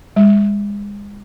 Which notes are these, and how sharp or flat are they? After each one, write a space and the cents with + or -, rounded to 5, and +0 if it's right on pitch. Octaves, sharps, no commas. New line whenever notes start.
G#3 -30